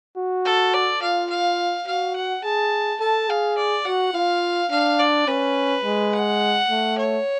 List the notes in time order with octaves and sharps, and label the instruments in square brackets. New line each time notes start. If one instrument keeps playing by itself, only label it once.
[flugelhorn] F#4
[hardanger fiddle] A4
D5
[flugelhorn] F4 [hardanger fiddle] F5
[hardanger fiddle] F5
[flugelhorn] F#4 [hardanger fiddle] F5
[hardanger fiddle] F#5
[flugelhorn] G#4 [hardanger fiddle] A5
[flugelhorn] A4 [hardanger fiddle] A5
[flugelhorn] G#4 [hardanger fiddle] F5
[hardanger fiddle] D5
[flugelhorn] F#4 [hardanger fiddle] F#5
[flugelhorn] F4 [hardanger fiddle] F5
[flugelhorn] D4 [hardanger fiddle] F5
[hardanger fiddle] D5
[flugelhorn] C#4 [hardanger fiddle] B4
[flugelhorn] G#3
[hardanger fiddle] F#5
[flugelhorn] A3
[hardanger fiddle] C#5